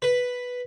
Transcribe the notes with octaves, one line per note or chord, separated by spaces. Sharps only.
B4